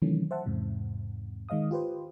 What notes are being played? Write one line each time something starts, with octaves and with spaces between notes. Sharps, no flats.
C3 D#3 E3 F#3 A3 C#4
C5 E5 F#5 A5
E2 G#2 C3
D#3 G#3 D#5 F5 D#6
F4 G4 B4 C5